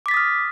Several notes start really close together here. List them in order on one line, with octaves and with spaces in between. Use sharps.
D6 B6 A6 D#6 F6